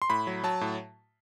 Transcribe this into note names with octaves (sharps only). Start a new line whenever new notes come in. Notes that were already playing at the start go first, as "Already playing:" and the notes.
C6
A2 B5
F#3
F#3 A5
A2